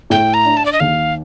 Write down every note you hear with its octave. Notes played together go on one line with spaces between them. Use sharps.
A2 G5
A#5
D4
A5
D5
D#5
D#2 F5